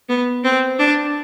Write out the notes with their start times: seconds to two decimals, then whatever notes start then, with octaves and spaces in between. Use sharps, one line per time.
0.09 B3
0.44 C4
0.79 D4